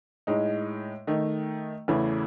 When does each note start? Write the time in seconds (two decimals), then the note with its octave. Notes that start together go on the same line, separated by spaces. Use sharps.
0.27 A2 G#3 D#4
1.07 D#3 A3 D#4
1.88 E2 C#3 E3 A3 E4